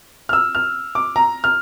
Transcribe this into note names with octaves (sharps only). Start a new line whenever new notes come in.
F6
E6
F6
D6
A#5
F6